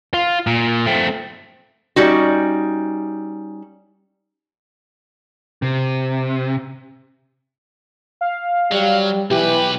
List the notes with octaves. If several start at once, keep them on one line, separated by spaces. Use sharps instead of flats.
F4
A#2
A3 C4
G3 C#4 D#4 F#4
C3
F5
F#3 G3
B1 E3 G4 B4